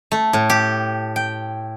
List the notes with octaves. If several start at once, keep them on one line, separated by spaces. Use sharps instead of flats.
A3
A2
G4
G5